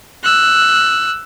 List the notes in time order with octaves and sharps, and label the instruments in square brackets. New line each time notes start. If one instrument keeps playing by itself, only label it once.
[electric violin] E6 F#6